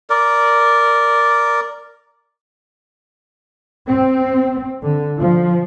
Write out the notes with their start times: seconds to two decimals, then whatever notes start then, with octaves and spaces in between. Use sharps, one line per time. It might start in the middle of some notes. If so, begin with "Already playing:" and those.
0.10 A#4 D5
3.88 C4
4.82 D3
5.18 F3